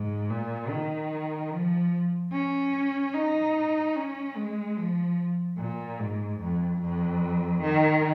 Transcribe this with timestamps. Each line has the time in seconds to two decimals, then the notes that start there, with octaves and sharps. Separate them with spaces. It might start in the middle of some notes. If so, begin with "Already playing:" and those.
Already playing: G#2
0.29 A#2
0.70 D#3
1.51 F3
2.32 C#4
3.14 D#4
3.96 C#4
4.36 G#3
4.77 F3
5.58 A#2
5.99 G#2
6.41 F2
6.81 F2
7.62 D#3